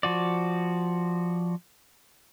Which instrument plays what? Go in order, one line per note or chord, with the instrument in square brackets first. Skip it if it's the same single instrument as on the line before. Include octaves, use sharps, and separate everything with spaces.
[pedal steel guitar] F3 F#4 D5